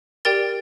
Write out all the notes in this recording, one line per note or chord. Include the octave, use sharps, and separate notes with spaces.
G4 A#4 D5 G5 A6